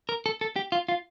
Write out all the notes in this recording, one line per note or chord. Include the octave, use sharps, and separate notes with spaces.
A#4
A4
A4
G4
F4
F4